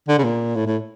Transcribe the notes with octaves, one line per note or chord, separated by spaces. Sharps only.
D3
C#3
A#2
A2
A2